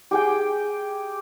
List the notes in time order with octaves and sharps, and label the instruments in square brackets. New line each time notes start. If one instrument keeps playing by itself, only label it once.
[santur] G4 G#4 G5